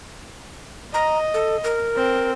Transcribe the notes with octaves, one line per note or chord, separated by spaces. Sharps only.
D#5 A#5
A4
A#4
C4